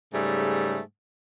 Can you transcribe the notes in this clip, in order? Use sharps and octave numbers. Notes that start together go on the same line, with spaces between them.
G#2 C#3 G3 A3